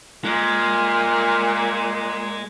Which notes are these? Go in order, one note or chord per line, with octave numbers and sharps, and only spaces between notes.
A#2 G#3 F6